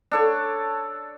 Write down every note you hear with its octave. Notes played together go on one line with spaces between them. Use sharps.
D4 A4 C#5